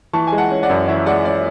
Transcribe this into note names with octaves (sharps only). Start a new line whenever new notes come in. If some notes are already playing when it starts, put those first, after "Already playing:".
E3 A5 C#6
G#3 G#5
F#5 A5
C#4
D5 F#5
F#2
E3 C#5 E5
G#3 D5 F#5
C#4 D5